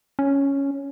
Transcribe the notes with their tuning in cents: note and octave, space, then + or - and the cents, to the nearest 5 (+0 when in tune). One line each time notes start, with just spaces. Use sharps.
C#4 +0